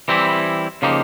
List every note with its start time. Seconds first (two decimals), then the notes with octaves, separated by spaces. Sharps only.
0.08 E3 G3 C4 E4 G4
0.82 C#3 F3 A#3 D#4 G4